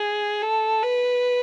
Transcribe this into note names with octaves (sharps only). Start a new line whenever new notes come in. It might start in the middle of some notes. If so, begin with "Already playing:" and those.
Already playing: G#4
A4
B4